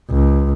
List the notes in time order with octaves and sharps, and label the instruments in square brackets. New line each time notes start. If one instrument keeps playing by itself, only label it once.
[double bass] C#2